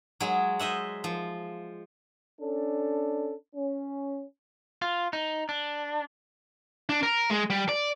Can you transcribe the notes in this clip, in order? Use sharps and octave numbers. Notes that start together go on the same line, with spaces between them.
F#3 G#3
C5 D#5 E5 F#5
F3
C#4 D4 A4
C#4
F4
D#4
D4
D4
A#4
G#3
G3
D5